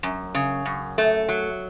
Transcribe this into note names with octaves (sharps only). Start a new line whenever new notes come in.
F#2
C#3
F#2
A3
F#3